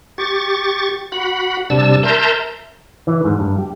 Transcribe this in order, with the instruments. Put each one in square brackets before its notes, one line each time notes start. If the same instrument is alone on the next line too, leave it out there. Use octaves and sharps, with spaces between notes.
[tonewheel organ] G4 C#6 A6
F#4 F#5 B5
C3 G3 D4 A5 E6
A#4 E5 A5 A#5 C6 G6
[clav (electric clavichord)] E3
G#2
G2
G4